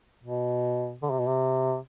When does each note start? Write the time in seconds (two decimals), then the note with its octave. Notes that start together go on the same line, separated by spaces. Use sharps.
0.24 B2
1.03 D3
1.11 C3
1.19 B2
1.27 C3